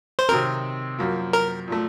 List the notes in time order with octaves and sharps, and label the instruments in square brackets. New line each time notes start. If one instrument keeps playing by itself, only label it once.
[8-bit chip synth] C5
[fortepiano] C3 D#3 F#3 C4 [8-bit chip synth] A#4
[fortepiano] F#2 F3 A#3
[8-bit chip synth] A#4
[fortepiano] A#2 F3 A3